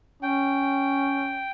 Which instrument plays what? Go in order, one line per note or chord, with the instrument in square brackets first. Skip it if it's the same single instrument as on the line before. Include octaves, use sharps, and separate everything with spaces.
[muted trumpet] C#4 [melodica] G5